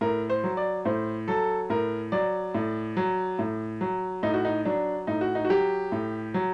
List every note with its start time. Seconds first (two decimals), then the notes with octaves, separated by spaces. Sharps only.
0.01 A2 A#4
0.30 C5
0.44 F#3
0.57 D5
0.85 A2 C5
1.28 F#3 A4
1.70 A2 A#4
2.12 F#3 D5
2.54 A2
2.97 F#3
3.39 A2
3.81 F#3
4.23 A2 D#4
4.34 F#4
4.45 D#4
4.65 F#3 D4
5.07 A2 D#4
5.21 F#4
5.35 D#4
5.45 F#4
5.50 F#3 G4
5.92 A2
6.34 F#3